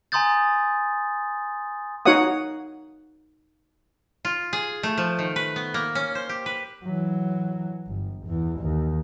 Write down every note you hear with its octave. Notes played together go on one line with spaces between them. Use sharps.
G#5 A#5 C6 D#6 G6 A6
D#4 F#4 C#5 F5 F#5 D#6
F4
G#4
A3
F3
D#3
B4
B3
A#3
C#4
C5
G4
B4
E3 F#3
G1
E2 E3
D#2